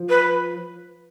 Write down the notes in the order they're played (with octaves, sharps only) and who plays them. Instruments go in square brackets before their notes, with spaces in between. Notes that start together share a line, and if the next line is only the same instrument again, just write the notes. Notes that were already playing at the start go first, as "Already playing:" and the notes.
Already playing: [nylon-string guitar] F3
[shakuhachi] B4